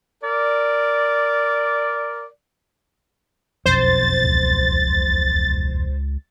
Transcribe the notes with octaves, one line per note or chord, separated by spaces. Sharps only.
A#4 D5
E1 B1 F2 C5 A6
C#2